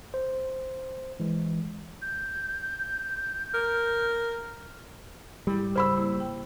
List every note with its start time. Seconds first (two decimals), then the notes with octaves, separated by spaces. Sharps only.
0.14 C5
1.20 E3 G#3
2.02 G6
3.54 A#4
5.47 G#2 G3 E4
5.76 C#3 G#4 C5 B5 C#6 E6
5.97 A#3 E4
6.20 G5